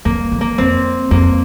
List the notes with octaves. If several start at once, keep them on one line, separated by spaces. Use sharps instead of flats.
F2 A#3
F2
A#3
F2 C4
F2 A#3